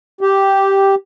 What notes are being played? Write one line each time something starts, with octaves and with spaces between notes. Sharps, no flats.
G4